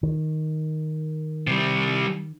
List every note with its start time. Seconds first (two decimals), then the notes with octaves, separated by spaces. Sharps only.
0.03 D#3
1.47 C3 G3